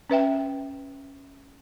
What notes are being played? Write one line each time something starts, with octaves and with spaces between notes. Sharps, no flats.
C#4 B4 E5 G5